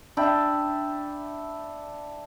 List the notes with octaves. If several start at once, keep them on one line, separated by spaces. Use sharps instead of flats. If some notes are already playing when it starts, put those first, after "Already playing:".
D4 E5 G5 B5